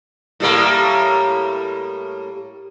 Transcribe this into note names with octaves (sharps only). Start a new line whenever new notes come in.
A2 G3 A#3